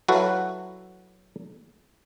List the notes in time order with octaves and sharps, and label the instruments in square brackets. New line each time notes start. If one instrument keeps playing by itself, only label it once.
[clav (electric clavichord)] F#3 E4 F#4 A4 B4 F5